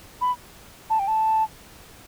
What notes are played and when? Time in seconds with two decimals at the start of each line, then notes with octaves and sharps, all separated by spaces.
0.21 B5
0.90 A5
0.99 G5
1.08 A5